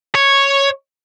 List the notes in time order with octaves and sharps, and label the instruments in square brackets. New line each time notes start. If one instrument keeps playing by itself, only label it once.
[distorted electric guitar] C#5